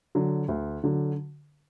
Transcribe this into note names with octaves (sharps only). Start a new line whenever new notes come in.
D3 F#3
D2
D3 F#3